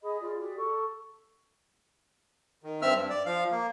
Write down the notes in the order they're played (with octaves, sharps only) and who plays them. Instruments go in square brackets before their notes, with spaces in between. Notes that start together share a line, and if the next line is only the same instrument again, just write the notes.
[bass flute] G#4 [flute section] D#5 B5
[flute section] F4 D5 B5 [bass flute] G#4
[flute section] F#4 G4 D5
[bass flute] A4 [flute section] C#6
[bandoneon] D#3
G2 C4 E5 E6 F6
G2
D5
F3 F5
A#3